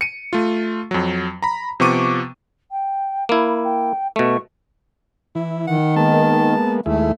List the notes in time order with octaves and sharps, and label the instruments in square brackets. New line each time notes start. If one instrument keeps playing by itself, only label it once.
[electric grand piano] C#7 D#7
A3 F4
F2 F#3
A#5 B5
C3 F3 B3 C#6 D6 D#7
[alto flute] G5
[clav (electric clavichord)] A#3 E4 [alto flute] B5
[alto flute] G5
[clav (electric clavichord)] B2 A3 [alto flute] C#6
[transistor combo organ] E3 [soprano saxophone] E4
[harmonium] D#3 [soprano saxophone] F#5
[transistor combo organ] G#3 A#3 B3 [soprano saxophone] A5
[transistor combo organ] D#2 G#3 E4 [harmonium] A3